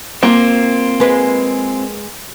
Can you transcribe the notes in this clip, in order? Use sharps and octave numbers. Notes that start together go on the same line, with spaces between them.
A#3 C4 F4
G#3 B4